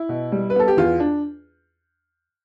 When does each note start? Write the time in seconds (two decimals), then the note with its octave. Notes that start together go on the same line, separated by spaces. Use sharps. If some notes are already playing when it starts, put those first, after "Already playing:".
Already playing: E4
0.09 B2
0.32 G3
0.50 B4
0.55 B3 A4
0.68 G4
0.77 E2 F4
1.00 D4